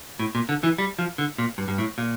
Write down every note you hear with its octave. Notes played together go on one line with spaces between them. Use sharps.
A2
A#2
D3
E3
G3
F3
D3
A#2
G2
G2
A2
A#2